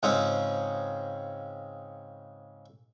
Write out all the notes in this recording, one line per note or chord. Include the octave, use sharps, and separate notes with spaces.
G#2 C#3 G#3 C4 C#4 F4